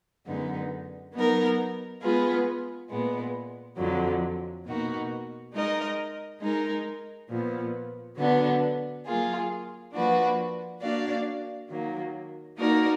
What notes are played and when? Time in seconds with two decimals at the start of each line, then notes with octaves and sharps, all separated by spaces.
0.25 F#2 D3 G#3 B3 D#4
1.13 F#3 B3 D#4 A#4
2.01 G#3 B3 F4 G#4 B4
2.89 A#2 G#3 B3
3.77 F2 D3 F#3
4.65 B2 A#3 D#4 F#4
5.52 G#3 D#4 A#4 D#5
6.40 G#3 D#4 A#4
7.28 A#2 F3 B3
8.17 D3 F#3 B3 D4
9.04 F#3 A#3 F4 G#4
9.93 F3 A#3 D4 F#4 B4
10.81 A#3 D4 F#4 D5 F5
11.68 D#3 F#3 A#3
12.57 A#3 D#4 F#4 A#4 D5